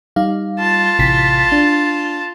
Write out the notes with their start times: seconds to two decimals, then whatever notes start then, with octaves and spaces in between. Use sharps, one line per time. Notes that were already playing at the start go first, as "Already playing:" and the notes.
0.16 G3 D#4 F5
0.59 F4 A5
0.99 A1 C3 B6
1.52 D4